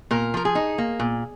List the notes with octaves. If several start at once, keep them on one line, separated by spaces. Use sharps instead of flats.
A#2 A#4
F3 A#4
G#4
D#4
A#3
A#2